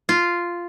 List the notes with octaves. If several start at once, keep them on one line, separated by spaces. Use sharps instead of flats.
F4